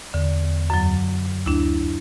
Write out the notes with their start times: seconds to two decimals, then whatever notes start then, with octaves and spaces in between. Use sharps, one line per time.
0.14 E2 D3
0.70 F#2 F#3
1.46 D2 D4 E4